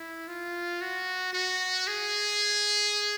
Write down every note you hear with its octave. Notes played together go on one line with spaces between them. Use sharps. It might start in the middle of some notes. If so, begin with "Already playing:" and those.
Already playing: E4
F4
F#4
F#4
G#4